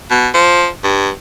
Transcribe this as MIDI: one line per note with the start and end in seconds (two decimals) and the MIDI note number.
0.11 0.28 47
0.34 0.67 53
0.84 1.10 43